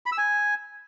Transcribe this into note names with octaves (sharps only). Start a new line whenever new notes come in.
B5
E6
G#5